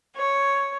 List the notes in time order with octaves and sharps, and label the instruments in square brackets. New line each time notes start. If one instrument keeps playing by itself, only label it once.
[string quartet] C#5